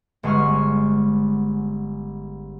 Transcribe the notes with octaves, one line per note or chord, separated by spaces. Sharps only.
G1 G#3 F#5 C#6 F6